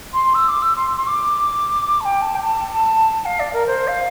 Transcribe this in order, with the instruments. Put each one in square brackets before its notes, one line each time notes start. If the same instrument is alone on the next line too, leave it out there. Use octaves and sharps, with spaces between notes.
[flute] C6
E6
D6
E6
C6
C6
D6
A5
G5
A5
G5
A5
F5
D5
A#4
C5
F5